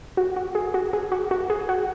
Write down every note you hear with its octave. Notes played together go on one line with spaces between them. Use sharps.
F#4
F#4
G#4
F#4
G#4
F#4
F#4
G#4
F#4